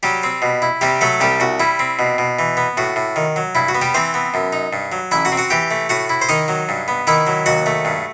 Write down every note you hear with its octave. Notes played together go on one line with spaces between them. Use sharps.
F#3 G3 G4
C4
B2
E4
C3 G3 G4
F#3 A3 A4
C2 G3 G4
C2 F#4
G3 E4
C4
B2
B2
E3
B3
A2 F#4
A2
D#3
F#3
G2 E4
F#4
B3
G3 G4
E3 C4 C5
B3
F#2
D#4
G2
F#3
A1 E4 E5
F#4 F#5
C4
F#4 F#5
E3 G4 G5
A3
A2 F#4 F#5
E4
C5
D#3 D#4 D#5
F#3
G2
B3
D#3 E4 E5
F#3
D#2 F#4 F#5
A3
G2